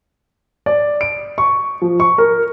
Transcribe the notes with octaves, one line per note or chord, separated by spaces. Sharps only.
D5
D7
C#6
F3
C#6
A#4